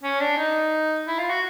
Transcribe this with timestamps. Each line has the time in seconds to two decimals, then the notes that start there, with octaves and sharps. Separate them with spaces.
0.03 C#4
0.20 D4
0.37 D#4
1.07 E4
1.19 F4
1.30 F#4